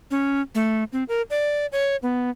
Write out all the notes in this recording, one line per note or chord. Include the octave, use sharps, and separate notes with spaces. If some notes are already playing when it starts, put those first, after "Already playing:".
C#4
A3
C4
A#4
D5
C#5
B3